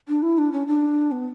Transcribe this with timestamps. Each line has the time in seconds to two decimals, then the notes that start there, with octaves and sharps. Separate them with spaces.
0.09 D4
0.22 E4
0.38 D4
0.52 C#4
0.67 D4
1.12 B3